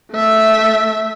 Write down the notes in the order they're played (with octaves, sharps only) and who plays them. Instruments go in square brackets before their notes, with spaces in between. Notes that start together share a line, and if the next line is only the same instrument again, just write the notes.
[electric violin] A3 E5